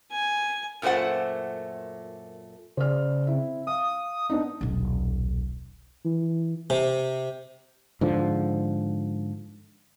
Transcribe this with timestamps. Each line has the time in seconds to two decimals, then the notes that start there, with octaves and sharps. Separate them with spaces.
0.11 G#5
0.82 F#2 A#2 A3 C5 F#5
2.77 C#3 C5 D5 F6
3.27 C4 E4
3.67 F5 D#6
4.30 B3 D4 D#4
4.61 D#1 B1
6.05 E3
6.70 C3
8.01 G#2 D3 F3